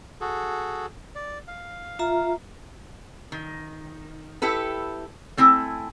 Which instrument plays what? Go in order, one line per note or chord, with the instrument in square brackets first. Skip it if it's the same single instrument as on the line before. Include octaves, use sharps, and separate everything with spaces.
[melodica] F#4 G#4 A4
D5
F5
[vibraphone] F4 E5 A#5
[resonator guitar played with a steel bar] D#3
E4 G4 A4 B4
A3 C4 E4 G#5